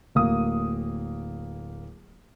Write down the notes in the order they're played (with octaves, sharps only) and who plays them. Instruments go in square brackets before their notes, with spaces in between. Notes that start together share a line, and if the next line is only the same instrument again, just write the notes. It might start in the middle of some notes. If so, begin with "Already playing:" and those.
[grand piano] D1 A#3 D#6